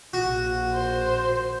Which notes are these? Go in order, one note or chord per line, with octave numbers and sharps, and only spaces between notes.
A#1 A#2 F#4
C5